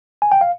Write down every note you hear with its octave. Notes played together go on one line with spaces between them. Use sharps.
G#5
G5
F5